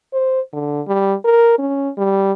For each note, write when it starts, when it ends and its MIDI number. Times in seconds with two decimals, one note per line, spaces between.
0.13 0.40 72
0.53 0.81 50
0.87 1.14 55
1.25 1.55 70
1.59 1.89 61
1.98 2.32 55